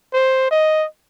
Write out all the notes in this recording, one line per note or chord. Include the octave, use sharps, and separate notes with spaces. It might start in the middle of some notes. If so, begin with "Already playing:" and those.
C5
D#5